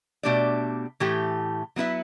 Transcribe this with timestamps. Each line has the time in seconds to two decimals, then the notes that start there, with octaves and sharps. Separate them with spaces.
0.23 B2 A3 D4 G4 D5
1.00 A2 E3 A3 G4
1.76 F#3 B3 E4 B4 E5